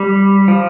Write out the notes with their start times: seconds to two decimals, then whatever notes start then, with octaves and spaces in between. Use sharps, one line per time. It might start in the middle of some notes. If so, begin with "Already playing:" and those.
Already playing: G3
0.48 F3